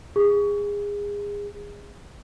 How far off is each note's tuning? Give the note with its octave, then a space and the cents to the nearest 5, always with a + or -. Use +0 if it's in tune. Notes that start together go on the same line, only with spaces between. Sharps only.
G#4 -25